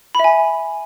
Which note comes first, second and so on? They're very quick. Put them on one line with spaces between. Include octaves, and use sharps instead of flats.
B5 E5 G#5